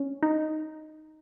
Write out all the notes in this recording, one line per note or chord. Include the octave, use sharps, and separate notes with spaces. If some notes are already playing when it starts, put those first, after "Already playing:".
Already playing: C#4
D#4